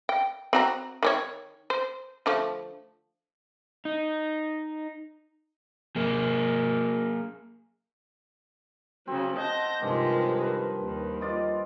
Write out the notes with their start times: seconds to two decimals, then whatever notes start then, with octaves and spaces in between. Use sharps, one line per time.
0.09 G5
0.53 C4 F#4 A#5
1.03 D#3 G4 C#5
1.70 C5
2.26 D3 F3 A3
3.85 D#4
5.96 A#3 G#4
9.07 C#3 F#3 C4
9.37 D#5 F#5 A5 G6 A#6
9.82 G2 C3 D#3 F3 G#3
10.43 D#3 B4
10.80 D#2 D#3
11.21 F4 D5 D#5